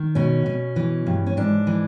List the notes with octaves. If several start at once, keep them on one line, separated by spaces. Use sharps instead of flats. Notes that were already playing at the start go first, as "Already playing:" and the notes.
Already playing: D#3
B2 C#4
B2
E3
G2
C#4
G#2 D4
E3